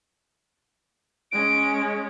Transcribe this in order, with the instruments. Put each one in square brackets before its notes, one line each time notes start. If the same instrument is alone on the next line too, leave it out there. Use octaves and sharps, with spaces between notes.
[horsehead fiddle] G#3 C#4 [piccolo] D7